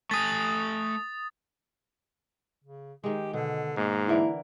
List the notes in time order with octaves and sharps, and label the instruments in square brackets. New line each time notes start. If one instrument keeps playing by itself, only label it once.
[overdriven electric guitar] A3 G#5 [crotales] D#6 A6
[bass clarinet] C#3
[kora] D#3 G#3 [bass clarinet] G4
[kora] B2 [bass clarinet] D3
[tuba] G#2 [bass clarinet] A#3
[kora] D3 E3 A#4 [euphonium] E4